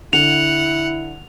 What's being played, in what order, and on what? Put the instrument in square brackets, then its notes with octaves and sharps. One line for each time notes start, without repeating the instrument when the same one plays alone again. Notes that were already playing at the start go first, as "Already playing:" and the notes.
[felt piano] D3 [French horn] E4 [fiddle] F#5 [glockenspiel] F7